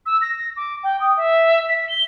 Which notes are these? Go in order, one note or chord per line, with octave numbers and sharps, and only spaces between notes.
E6
A#6
D6
G5
D#6
E5
B6
G7